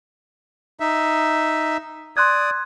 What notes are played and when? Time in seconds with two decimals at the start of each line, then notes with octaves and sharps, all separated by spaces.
0.80 D#4 E5
2.17 D5 C6 D#6 F#6 G#6